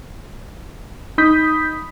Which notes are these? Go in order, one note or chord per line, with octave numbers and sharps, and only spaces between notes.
D#4 B5 D#6 G6 B6